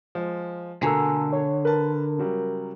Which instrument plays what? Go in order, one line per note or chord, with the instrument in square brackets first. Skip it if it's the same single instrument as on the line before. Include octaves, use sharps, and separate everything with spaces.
[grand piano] F3 G#3
[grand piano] B2 A3 A#3 [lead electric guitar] D3 [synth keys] G#5 A#5 E6
[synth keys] C#5
[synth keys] A#4 [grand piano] B4 A5
[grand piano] C#3 F#3 G3